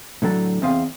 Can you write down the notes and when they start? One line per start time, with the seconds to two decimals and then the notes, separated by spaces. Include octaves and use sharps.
0.22 A2 D3 F#3 A4
0.62 E2 C4 D#5 F5